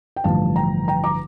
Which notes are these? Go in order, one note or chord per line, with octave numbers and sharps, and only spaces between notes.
G5
A1 G2 D3 F3 F5 A5
G5 A#5
G5 A#5
A#5 D6